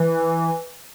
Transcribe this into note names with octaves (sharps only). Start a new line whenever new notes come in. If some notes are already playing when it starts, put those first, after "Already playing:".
Already playing: E3